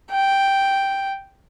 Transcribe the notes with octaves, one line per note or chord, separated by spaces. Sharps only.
G5